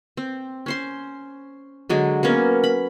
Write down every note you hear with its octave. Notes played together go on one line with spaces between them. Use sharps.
C4
C#4 C5 C6
D3 F#3 G#3
A#3 B3 C#4 A#4
B5